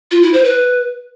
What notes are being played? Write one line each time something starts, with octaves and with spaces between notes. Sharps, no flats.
F4
E4
C5
B4